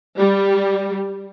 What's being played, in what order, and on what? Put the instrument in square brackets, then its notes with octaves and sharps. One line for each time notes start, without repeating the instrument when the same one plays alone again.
[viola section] G3